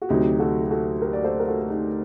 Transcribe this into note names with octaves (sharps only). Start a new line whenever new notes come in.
F#4
D2 C3 F#3 D#4 G4
F#4 A4
G4
F#4 A4
G4 A#4
D5
A4 C5
A#4
F#4 A4
A4
D#4 G4